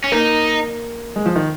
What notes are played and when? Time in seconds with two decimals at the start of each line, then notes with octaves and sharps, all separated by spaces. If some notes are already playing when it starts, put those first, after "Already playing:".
0.04 C#4
0.12 A#3 D#4
1.16 G#3
1.26 F3
1.36 D#3